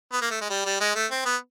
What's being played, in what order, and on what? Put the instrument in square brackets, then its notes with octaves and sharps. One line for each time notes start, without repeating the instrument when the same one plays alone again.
[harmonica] B3
A#3
A3
G#3
G3
G3
G#3
A3
C4
B3